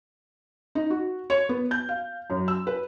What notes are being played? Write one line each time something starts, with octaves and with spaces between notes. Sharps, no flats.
D#4
F#4
C#5
B3
G6
F5
F#2
E6
B4